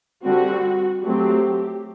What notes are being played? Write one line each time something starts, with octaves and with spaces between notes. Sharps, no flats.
D3 G3 C4 F#4
F#3 A3 C4 G4